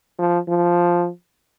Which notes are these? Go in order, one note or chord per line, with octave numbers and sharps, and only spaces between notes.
F3
F3